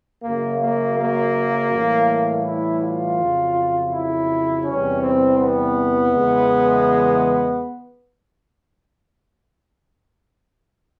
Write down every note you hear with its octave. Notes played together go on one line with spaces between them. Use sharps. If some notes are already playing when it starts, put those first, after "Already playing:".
F#2 C#3 F#3 A#3
A#3
A#3
A2 E3 G3
E4
F4
F2 C#3 F#3
E4
E2 C3 E3 G3 C#4
C4
B3
E2 C#3 E3 G#3